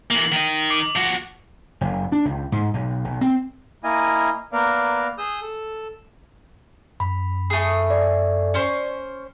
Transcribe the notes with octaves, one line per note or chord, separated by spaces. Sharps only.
E3 A#3 F#7
D#3 D#5
D6 C7
F3 F#4
F#1
D4
C#2
G#2
B1
B1
C4
A#3 E4 D#5 F5 G#5
A#3 B3 A#4 D5 F5
G#4 D#6 E6 G6
A4
F#2 B5
A3 G#4
D5
C#4 C5 C6